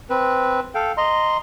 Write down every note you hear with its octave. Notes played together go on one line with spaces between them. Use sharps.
C4 B4
A4 F5 G5
D#5 A#5 C6